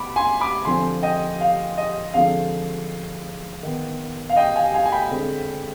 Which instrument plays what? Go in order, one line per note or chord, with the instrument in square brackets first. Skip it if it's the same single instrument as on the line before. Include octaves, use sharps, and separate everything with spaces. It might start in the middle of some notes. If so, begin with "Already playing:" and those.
Already playing: [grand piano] B3 B5 D6
G#5 C6
B5 D6
D3 F3 C4 G#5 C6
D#5 G5
F5
D#5
D3 F3 G#3 C4 F5
D#3 B3
F5
D#5 G5
F5 G#5
F5 G#5
G#5
G5 B5
D3 G#3 C4